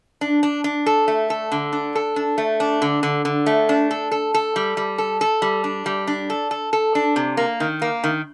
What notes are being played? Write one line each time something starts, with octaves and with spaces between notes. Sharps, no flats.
D4
D4
D4
A4
A3
A4
D3
D4
A4
D4
A3
D4
D3
D3
D3
A3
D4
A4
A4
A4
G3
G3
A4
A4
G3
D4
G3
D4
A4
A4
A4
D4
C3
A#3
D#3
A#3
D#3